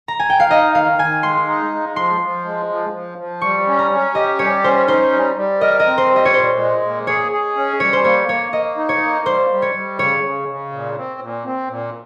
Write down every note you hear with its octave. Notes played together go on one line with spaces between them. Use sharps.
A#5
G#5
G5
F5
D#4 D#5
D#3 F5
D#3 G#5
G#3 C6
D#4
G#3
F3 C6
F3
G#3
F3
F3
F3
G3 C#6
C#4
A#5
C#4
G4 D#5
G3 C#5
C#4 C5
D#4 C5
G3
G3
A#4 D#5
D#5
C4
C5
G3
D#5
C#5
A#2 C5
G#3
A#2
G#4 C#5
G#4
C#4
G3 C#5
C5
A#3 C#5
A#3 C#5
A#3 D#5
D#4
C#5
A#3
G3 C5
G3
C#5
G3
C#3 C#5
C#3
C#3
A#2
C4
A#2
C4
A#2